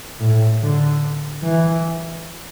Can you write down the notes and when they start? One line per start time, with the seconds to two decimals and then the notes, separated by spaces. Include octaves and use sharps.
0.20 A2
0.61 D3
1.43 E3